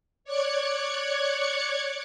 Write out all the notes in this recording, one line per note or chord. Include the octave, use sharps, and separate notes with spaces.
C#5 D5 D6 F#6 G#6 C#7